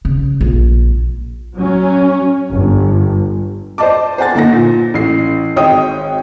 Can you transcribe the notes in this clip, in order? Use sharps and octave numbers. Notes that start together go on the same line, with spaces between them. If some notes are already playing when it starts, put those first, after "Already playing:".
C#3
A#1
F#3 C#4
G1
C5 D5 D#5 A5 D6
C5 F#5 G#5 A6
G1 A#3 D#4 F#5 A#6
A#2
A1 C7
G#1 G#2 C#5 D#5 G5 D#6